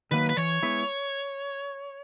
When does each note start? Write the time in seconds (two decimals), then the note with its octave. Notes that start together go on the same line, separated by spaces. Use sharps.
0.11 D#3 F#3 A#3 B4
0.29 B4
0.37 E3 C#5
0.63 G#3 B3 E4 B4